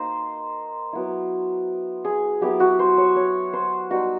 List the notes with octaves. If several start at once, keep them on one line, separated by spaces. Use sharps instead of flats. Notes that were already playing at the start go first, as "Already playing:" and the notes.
Already playing: A#3 D#4 C5
F#3 B3 E4
G#4
F#3 B3 E4 G4
F#4
C5
C#5
C#5
C5
G3 B3 D#4 F#4